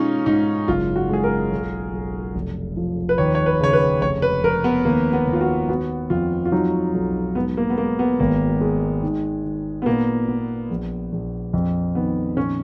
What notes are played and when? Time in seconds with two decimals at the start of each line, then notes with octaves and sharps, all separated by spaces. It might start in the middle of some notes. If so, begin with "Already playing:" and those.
Already playing: B2 G#3 C#4 D#4 F4
0.26 G#2 D#4
0.68 F#1 F4
0.96 F#4
1.09 G#3 G#4
1.24 A#4
1.51 B1
1.93 B1
2.35 F1
2.77 F3
3.09 B4
3.18 D#2 C#5
3.35 C#5
3.46 B4
3.61 C#3 C#5
3.73 B4
4.01 F1 C#5
4.22 B4
4.43 F2 A#4
4.64 B3
4.85 D#2 A#3
5.13 B3
5.27 D#2
5.33 F4
5.41 F#4
5.69 B3 F#4
6.10 F2 F4
6.45 F4
6.52 F#3 D#4
6.94 B1
7.35 G#2 B3
7.57 A#3
7.70 B3
7.78 G#3 A#3
7.99 B3
8.19 G#1 A#3
8.61 G#3
9.02 D#3
9.45 D#3
9.82 B3
9.86 A#2 A#3
10.28 B3
10.70 A#1
11.12 A#1
11.53 F2
11.95 D#3 B3
12.36 A#2 C#4